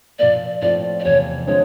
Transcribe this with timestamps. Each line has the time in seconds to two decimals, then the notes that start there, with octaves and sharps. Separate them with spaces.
0.19 A#2 F3 A#3 D5
0.62 A2 F3 A3 C4 F4 D5
1.00 D5
1.04 E2 C3 F3 C#5
1.47 D3 F3 G#3 C4 C#5